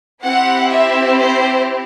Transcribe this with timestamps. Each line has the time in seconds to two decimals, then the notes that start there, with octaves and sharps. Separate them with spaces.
0.23 C4 E4 G4 F#5
0.71 E5
1.18 C5